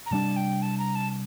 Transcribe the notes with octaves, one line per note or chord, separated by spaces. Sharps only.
A#5
C3 G3 A#3 D4 A5
G5
A5
A#5
A5